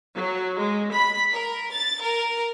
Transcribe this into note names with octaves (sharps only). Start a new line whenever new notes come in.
F#3
G#3
B5
A#4
A6
A#4